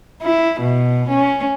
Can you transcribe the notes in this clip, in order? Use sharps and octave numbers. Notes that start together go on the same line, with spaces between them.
E4
B2
C#4